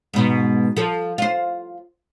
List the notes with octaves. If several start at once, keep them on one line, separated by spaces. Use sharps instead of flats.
G#2 B2
F3 A4
F4 C5